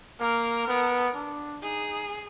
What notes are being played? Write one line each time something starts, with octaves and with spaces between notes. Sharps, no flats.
A#3 A#4
B3
D4
D#4 G#4